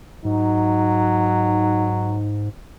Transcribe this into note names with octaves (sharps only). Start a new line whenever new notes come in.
G#2 F#3 D#4